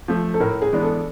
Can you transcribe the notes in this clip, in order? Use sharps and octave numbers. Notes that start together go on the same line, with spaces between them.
F3 A3
A4
A2 A#4
G#4
E3 G#3 B3 D4
A4